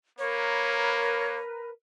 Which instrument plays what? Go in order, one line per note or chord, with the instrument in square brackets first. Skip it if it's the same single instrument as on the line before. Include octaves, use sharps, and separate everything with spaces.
[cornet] A#3 [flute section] A#4 B4 [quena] C#5